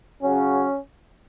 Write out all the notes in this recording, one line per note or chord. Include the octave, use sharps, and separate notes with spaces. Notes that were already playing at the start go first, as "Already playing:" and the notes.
C#3 F#3 C#4